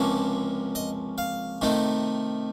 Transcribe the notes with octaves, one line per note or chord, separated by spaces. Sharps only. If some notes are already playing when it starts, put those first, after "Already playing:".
Already playing: C#2 C3 F3 A#3 C#4
D#5
F5
C3 D#3 A3 D#4